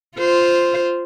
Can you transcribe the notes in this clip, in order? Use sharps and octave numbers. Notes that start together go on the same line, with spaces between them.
F4 C5